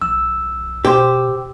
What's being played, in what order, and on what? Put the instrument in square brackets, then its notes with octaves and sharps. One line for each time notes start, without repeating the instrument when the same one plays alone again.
[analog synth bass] B1 [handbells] E6
[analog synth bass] B2 [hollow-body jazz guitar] G4 C5